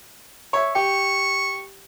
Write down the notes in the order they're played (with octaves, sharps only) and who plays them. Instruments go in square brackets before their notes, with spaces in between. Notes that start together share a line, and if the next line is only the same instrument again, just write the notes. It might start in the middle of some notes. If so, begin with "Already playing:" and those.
[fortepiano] C#5 E5
[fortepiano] G4 [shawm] C#6